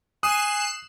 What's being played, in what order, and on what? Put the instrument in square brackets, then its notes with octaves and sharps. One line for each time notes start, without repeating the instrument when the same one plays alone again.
[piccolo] G#5 [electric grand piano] D#6 [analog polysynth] F#6 C7 E7